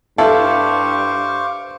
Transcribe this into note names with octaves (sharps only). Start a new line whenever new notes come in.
G2 E4 A4 C5 F5 C#6 D6